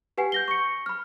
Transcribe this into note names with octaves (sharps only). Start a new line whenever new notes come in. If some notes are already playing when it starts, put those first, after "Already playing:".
G4 B4 F#5 G#5 C7
G6 A#6 G7
C#6 C#7
B5 F6